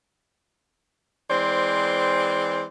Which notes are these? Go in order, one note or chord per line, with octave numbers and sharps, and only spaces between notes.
E3 G#3 C4 C5 D5